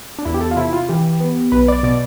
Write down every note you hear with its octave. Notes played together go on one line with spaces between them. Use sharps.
D4
E2 E4
G4
A4
F4
C3 E4
F4
E3 G4
B3
B1 B4
D5
B2 D5